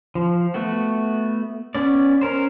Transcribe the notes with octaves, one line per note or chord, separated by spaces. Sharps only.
F3
A3 B3 F#4
B3 C#4 D5
C#4 A#4 C5